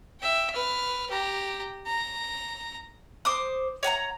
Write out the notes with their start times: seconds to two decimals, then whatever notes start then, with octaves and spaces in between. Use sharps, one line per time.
0.21 E5 G5
0.51 B4 F6
1.10 G4 A#5
1.86 A#5
3.25 C5 D6 D#6
3.83 C#5 F#5 G#5 A#5